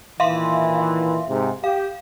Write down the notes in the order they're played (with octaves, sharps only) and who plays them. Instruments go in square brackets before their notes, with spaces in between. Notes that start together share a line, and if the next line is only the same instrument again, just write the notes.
[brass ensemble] A#2 D#3 E3 [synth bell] E5 F5 C6
[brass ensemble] G#2 C3
[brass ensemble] G4 [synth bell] F5